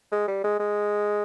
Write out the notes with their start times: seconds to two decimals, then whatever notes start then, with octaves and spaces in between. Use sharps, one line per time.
0.12 G#3
0.28 G3
0.44 G#3
0.60 G#3